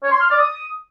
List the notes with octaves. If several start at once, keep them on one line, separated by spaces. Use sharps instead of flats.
C#5
C6
F6
D5
D#6